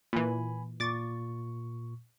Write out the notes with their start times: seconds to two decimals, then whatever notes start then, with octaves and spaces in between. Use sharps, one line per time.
0.13 A#2 E3 G#5 B5
0.80 A#2 C#6 D6 A6